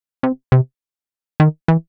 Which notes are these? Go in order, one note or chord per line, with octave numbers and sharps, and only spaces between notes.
C3
C3
D#3
E3